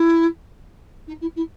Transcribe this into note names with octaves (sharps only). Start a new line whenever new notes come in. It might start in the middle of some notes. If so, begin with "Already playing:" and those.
Already playing: E4
D#4
E4
E4